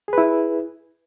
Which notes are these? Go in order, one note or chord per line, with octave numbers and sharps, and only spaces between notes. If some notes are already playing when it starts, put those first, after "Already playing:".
E4 G#4 B4